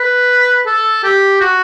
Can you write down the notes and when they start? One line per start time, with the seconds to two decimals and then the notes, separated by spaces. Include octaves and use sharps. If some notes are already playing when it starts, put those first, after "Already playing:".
Already playing: B4
0.66 A4
1.04 G4
1.41 F#4